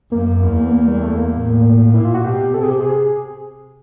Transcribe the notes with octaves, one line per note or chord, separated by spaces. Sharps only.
F#2 A#3
E2
B3
A#3
G3
A3
A#3
A2
A#2 E4
F4
F#4
B2 G4
C3 A4
G#4
G4
G#4